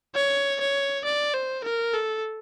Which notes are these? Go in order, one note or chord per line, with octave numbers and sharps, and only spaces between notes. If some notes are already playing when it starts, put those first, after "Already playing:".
C#5
C#5
D5
C5
A#4
A4